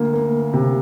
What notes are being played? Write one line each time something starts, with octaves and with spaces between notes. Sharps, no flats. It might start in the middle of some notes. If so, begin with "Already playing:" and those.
Already playing: D2 A#3
A#3
C3